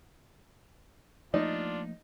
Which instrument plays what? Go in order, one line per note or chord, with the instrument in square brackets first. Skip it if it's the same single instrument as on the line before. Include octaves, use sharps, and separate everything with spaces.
[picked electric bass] F3 A3 A#3 [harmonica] D4 F4 [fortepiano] D#4